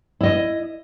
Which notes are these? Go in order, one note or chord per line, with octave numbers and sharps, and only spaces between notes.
E4 D#5